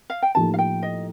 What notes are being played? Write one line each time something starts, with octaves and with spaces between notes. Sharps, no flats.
F5
G5
A2 F3 A#3 D#4 G4 A5
F5
G5
D#5